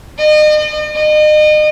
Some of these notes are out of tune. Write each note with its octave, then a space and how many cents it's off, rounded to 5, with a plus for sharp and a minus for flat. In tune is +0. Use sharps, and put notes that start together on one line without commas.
D#5 -40
D#5 -35